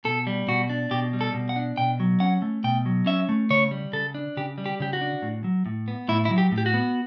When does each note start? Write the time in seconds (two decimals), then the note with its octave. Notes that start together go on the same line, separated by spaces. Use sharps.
0.05 B2 A4
0.27 G3
0.48 B2 F#4
0.70 D4
0.91 B2 G4
1.13 G3
1.21 A4
1.34 B2
1.49 F#5
1.56 D4
1.77 B2 G5
2.00 F#3
2.20 C#4 F#5
2.42 A3
2.64 B2 G5
2.86 F#3
3.06 C#4 E5
3.29 A3
3.50 C#3 C#5
3.71 G3
3.93 C#3 A4
4.15 D4
4.37 C#3 G4
4.58 G3
4.66 G4
4.80 C#3 G4
4.93 F#4
5.01 D4
5.22 A2
5.44 F#3
5.66 A2
5.88 B3
6.08 A2 E4
6.25 E4
6.31 F#3
6.38 G4
6.52 A2
6.58 G4
6.66 F#4
6.74 B3